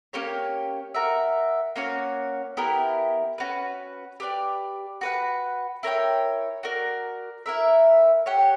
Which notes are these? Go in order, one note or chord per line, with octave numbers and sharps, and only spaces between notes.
A#3 C#4 G4 C#5
F#4 A#4 E5
A#3 C#4 F#4 C#5
B3 E4 G4 A#4
C#4 F#4 B4
G4 B4 D5
F#4 B4 F#5
E4 A#4 C#5 G5
F#4 A#4 D5
E4 A#4 E5
G4 C#5 F#5